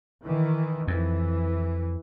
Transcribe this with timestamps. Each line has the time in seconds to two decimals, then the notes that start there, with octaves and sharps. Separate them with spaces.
0.24 D#3 E3
0.87 F2 E3